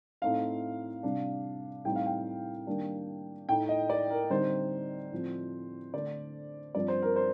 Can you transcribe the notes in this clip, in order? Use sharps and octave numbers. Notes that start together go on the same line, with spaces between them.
A2 A3 C4 D#4 F5
C3 G3 D4
A2 G3 C4 D#4 G5
F5
G5
D#3 G3 A#3 D4
A2 A3 D#4 G5
D#5
D5
A#4
D3 G3 C4 D#4 C5
A2 F3 C4
D3 A3 D4 D5
G2 F3 C4 D5
C5
A#4
C5